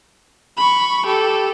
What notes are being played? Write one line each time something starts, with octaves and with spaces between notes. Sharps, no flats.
B5 C#6
G4 A4